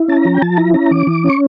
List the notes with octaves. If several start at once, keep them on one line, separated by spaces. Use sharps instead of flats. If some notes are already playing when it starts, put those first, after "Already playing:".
Already playing: E4
C#4 A5
A#5
F3
G5
F3 A5
E4 A#5
C#4 A#5
E3 D6
E3
C#4
C#6